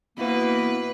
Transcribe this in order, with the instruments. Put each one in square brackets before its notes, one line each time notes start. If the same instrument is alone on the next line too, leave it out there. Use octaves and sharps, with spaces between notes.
[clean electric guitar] B2 E4 F#4 [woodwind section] A#3 [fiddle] B4